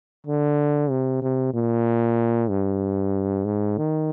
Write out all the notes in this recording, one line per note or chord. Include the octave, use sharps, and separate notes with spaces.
D3
C3
C3
A#2
G2
G#2
D#3